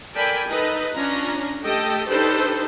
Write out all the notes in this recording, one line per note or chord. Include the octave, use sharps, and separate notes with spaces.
A4 A#4 D5 G5 G#5 B5
D#4 A4 B4 D#5
C#4 D4 F4 A#5
A3 G4 A4 D#5 G5
D4 D#4 G4 A4 B4 C5